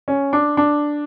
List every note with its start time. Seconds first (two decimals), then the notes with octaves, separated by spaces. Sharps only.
0.08 C#4
0.33 D4
0.57 D4